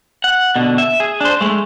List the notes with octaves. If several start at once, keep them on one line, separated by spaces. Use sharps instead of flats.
F#5
B2 D3
E5
G#4
D4 C5
G#3 A3